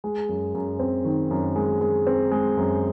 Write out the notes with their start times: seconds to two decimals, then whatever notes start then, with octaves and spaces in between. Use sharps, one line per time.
0.04 G#3
0.29 F#2
0.54 F#2
0.79 C4
1.05 D#3
1.31 F#2
1.56 G#3
1.81 G#3
2.07 C4
2.31 G#3
2.57 F#2